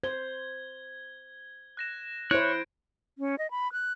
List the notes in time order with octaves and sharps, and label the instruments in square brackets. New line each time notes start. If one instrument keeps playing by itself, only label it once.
[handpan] C5 [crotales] G#6 G7
[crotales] F#6 A#6 E7
[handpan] E4 C5 [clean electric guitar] C#5 [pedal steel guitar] F#6 [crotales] G#6 D7
[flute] C#4
D#5
B5
F#6